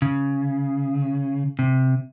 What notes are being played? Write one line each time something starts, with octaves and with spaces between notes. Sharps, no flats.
C#3
C3